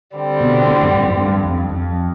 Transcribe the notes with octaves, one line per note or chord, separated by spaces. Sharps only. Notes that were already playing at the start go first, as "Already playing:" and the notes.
D3 G3 C4
B2
A2
F#2
G2
F#2
G2
F2
F2